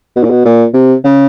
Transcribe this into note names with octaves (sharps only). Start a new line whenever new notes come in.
B2
A#2
B2
A#2
C3
C#3